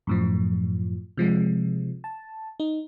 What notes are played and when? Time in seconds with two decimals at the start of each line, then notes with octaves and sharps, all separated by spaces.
0.07 F#2 A2 F3
1.17 C3 F3 G#3
2.04 A5
2.60 D#4